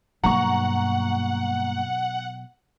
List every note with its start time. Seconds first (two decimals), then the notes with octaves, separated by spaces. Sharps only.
0.24 G2 B2 F#3 A#3 F#5 A#5 C#6